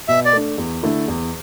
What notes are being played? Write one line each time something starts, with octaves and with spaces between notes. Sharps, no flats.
B2 E5
D5
A3 D4
E2
D3 A3 E4
E2